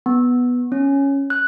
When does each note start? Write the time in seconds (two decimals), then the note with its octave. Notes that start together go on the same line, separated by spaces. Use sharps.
0.06 B3
0.72 C#4
1.30 F#6